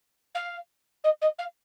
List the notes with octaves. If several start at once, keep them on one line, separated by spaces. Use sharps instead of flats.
F5
D#5
D#5
F5